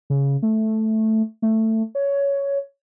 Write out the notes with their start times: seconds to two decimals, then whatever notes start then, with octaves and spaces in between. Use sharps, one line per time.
0.10 C#3
0.42 A3
1.42 A3
1.95 C#5